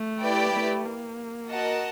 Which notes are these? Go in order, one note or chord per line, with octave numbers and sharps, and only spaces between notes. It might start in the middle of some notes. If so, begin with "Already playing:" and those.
Already playing: A3
E4 G4 B4 D5 G5
A3
A#3
F#4 A#4 D#5 F#5 A5